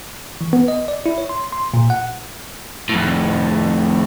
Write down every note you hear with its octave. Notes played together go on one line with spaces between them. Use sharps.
E3
B3
D#5
D5
E4
C#5
C6
C6
A#2
F#5
F2 A2